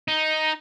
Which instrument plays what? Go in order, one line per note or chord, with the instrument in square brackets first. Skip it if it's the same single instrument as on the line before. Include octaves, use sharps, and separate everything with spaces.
[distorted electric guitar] D#4